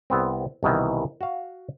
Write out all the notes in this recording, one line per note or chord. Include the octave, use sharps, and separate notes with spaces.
C2 B3 C4
C2 B2 D#3 E3
F#4 F5